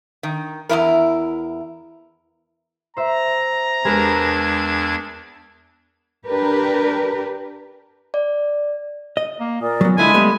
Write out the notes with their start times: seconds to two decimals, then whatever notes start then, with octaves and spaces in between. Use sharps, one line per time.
0.23 D#3
0.69 E2 G#2 E4 A#4
2.97 C5 E5 A#5
3.84 E2 G#3 D4 A#4 B4 G#6
6.26 D4 G4 A#4 B4
8.14 D5
9.17 D#5
9.40 A#3
9.61 A#2 A#4 D5 D#6
9.81 F#3 B3
9.98 D3 G#3 E4 F4 G#5 A5 B5 D#6
10.14 G3 A3 B3